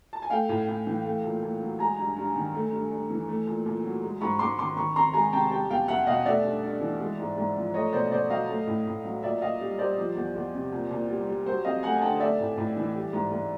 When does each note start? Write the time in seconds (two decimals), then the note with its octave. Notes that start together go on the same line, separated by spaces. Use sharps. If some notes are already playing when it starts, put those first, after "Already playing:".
0.13 A5
0.22 G#5
0.30 A3 F5 G5
0.49 A2
0.68 A2
0.87 E3
1.05 A3
1.24 A#2
1.42 A#2
1.60 F#3
1.79 G#3 G#5 A#5
1.99 G2
2.17 G2
2.35 D#3
2.54 A3
2.72 G2
2.91 G2
3.10 E3
3.28 A3
3.47 A#2
3.66 A#2
3.84 F#3
4.03 G#3
4.21 G#2 B5 C#6
4.39 G#2 C6 D6
4.58 D#3 C6 D6
4.76 D#3 B5 C#6
4.95 F2 A#5 C6
5.14 G#3 G#5 A#5
5.32 C3 G5 A5
5.51 G3 G5 A5
5.70 E2 F5 G5
5.88 E2 E5 F#5
6.07 B2 D#5 F5
6.26 A3 D5 E5
6.44 G2
6.64 G2
6.81 E3
7.00 G#3
7.19 G#2
7.38 G#2
7.56 F3
7.74 A3 C#5 D#5
7.93 B2 C5 D5
8.11 B2 C5 D5
8.30 F#3 D#5 F5
8.49 A3
8.67 A2
8.87 A2
9.05 F#3
9.23 A#2 D5 E5
9.42 A#2 D#5 F5
9.61 G3
9.78 G3 C5 D5
9.98 F3
10.16 E2
10.35 E2
10.54 C3
10.72 A#2
10.91 A#2
11.10 G3
11.28 G3
11.46 F#3 C5
11.64 F2 D#5 F5
11.83 A3 F#5 G#5
11.96 G#5
12.02 D3 G5 A5
12.20 A3 D5 E5
12.40 A2
12.57 A2
12.76 E3
12.96 G3
13.13 G#2
13.32 G#2